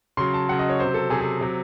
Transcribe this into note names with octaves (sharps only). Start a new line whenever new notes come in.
C#3 F#3 C6
A5
C#3 F#3 F#5
D#5
C#5
C3 F#3 C5
A4
C3 F#3 G#4
G#4
C3 F#3